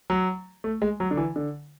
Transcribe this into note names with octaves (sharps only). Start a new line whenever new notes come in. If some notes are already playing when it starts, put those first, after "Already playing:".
F#3
A3
G#3
F#3
D3
E3
D3